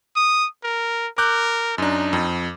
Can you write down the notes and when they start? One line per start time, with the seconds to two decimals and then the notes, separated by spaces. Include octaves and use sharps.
0.16 D#6
0.64 A#4
1.18 A#4 D6 F#6 G6
1.78 F#2 D4 D#4
2.13 F2